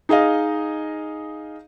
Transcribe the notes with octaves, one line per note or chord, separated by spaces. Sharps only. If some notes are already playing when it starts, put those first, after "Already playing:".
D#4 G#4 D#5 F5